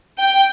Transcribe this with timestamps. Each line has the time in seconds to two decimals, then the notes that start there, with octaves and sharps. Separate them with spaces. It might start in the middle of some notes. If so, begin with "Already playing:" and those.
0.19 G5